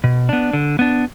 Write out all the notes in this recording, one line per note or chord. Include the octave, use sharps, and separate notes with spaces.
B2
B3 D4
D3
B3 D4